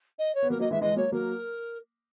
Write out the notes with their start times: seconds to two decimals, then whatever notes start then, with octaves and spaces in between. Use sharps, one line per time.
0.18 D#5
0.34 C#5
0.42 B3
0.50 F#3 A#3 A#4
0.60 F#3 A#3 D#5
0.71 E3 G#3 E5
0.81 E3 G#3 D#5
0.92 G#3
0.96 F#3 A#3 C#5
1.12 F#3 A#3 A#4